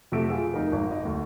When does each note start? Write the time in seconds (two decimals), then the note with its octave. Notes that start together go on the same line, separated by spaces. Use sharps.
0.12 F2 C3 F#3 A3 E5 D7
0.30 F4 G#4
0.53 F1 D#4 A#4
0.72 G#1
0.91 D#5
1.05 D2